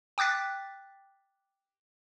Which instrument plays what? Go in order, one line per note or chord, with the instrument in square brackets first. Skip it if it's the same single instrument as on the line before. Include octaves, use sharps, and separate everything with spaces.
[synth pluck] G5 D6 F#6 A6 B6